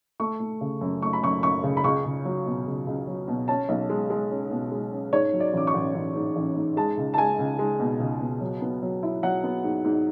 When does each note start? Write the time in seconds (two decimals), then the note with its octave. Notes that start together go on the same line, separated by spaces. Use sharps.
0.20 A3 C#6
0.40 A3
0.61 C#3
0.81 F#2
1.02 A3 C#6
1.13 B5
1.23 F#2 C#6
1.43 F#2 C#6
1.64 C#3
1.77 B5
1.84 C#2 C#6
2.05 C#2
2.25 F#3
2.46 B2
2.66 C#2
2.87 C#2
3.07 F#3
3.28 B2
3.48 C#4 A5
3.69 B1
3.89 G#3
4.10 G#3
4.31 C#4
4.50 B2
4.72 G#3
4.92 C#4
5.12 G#2 C#5
5.33 F#3
5.40 D5
5.53 A1 D6
5.67 C#6
5.74 A1
5.95 A1
6.15 G#2
6.36 A1
6.56 G#2
6.77 G#3 A5
6.97 C#2
7.14 A5
7.18 G#3 G#5
7.39 C#2
7.59 G#3
7.80 B2
8.00 C#2
8.20 B2
8.41 F#3
8.62 B3
8.82 F#3
9.03 E4
9.23 F#3 F#5
9.44 B3
9.64 G#2
9.85 G#2